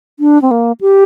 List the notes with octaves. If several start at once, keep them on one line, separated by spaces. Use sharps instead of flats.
D4
C4
A#3
G4